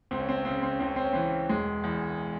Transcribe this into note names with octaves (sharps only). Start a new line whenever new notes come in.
C#2 C4
C#4
C4
C#4
C#3 C4
C#4
C4
C#4
C#2 C4
C#4
C4
C#4
E3 C4
E1 G#3
E2